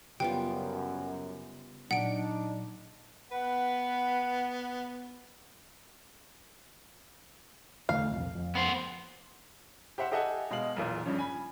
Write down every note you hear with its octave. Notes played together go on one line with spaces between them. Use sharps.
F#2 C#3 G3 B3 F4 G5
A#2 F#3 D4 D#4 F#5 D7
B3 B4 F#5
E1 D3 A3 F5
D#1 C2 F2
F2
B3 C5
G4 C5 E5 F#5
G4 A4 D#5 E5 F#5 G#5
B2 G#3 F5 F#7
B1 E2 A#2
G2 C#3 F3 C#4
G#5 B5